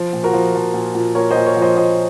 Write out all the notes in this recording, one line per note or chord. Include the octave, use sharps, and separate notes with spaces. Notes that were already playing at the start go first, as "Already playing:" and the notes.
Already playing: F3
A#2
F#4 A#4
F3
F3
A#2
A#2
A#2 A#4 C#5
C5 D#5
A#2
A#4 C#5
F3
C5 D#5
A#2 C5 D#5